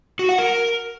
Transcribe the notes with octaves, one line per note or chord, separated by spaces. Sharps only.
F#4
F#5
A#4